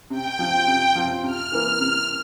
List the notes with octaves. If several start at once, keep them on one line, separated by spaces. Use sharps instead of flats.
C3 G5
F3 C4 F4
C3
F3 C4 F4
C3 F6
E3 A#3
C3